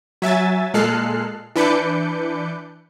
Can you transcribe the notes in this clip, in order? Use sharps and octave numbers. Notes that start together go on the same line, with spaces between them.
F#3 E5 G#5 A6
A#2 G#3 A4 F6 F#6 C7
E3 D4 B4 D6 G6 C#7